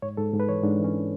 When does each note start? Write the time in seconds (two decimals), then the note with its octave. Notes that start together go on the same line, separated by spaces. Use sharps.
0.02 G#2 C#5
0.17 G#2 A4
0.33 G#2
0.40 B4
0.49 E3 C#5
0.64 G#2 D4
0.79 E3
0.84 C#4